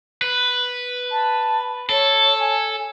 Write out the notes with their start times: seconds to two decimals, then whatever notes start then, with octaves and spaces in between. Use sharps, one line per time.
0.22 B4
1.11 A5
1.89 A4 C#5
2.38 G#5